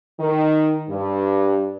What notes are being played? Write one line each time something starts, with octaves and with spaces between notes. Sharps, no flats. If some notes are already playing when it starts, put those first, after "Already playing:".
D#3
G2